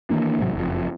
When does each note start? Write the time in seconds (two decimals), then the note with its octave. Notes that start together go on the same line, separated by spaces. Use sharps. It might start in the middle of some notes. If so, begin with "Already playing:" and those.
0.10 D#3 E3 A#3 D4
0.39 A1 G#2 C3 F#3
0.54 F#1 F2